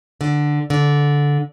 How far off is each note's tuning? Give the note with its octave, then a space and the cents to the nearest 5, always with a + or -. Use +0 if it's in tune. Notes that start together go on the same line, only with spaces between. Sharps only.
D3 +5
D3 -15